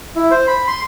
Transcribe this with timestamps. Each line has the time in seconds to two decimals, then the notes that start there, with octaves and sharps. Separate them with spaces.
0.16 E4
0.31 C5
0.47 B5
0.68 C6